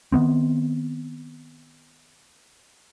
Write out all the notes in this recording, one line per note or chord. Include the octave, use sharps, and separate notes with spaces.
D#3 F3 B3 C4